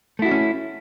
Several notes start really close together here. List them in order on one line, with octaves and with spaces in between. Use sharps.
A3 E4 F#4 D4 C#4